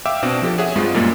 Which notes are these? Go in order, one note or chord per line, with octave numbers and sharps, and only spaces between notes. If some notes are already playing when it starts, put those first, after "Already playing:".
E5 F5 G5 D6 E6
B2 C4 D4
F3 G4 A4
G#4 C#5 E5 F#5 D#6
G2 G3 G#3 C4 F4
F#2 A#2 G3 A#3